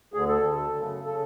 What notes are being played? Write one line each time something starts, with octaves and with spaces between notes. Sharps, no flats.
D2 D3 G#4
A4
D2 D3
F#2 C#3
C#3 A4